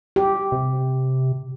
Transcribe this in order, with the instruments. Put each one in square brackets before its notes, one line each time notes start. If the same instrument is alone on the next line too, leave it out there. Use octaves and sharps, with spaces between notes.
[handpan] G4
[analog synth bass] C3